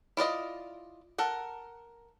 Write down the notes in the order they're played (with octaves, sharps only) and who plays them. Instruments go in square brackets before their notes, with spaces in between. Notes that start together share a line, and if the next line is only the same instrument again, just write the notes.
[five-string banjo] E4 F4 D5 D#5
A4 A#4 F#5